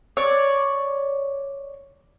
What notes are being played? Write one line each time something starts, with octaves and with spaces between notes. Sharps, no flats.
C#5 D5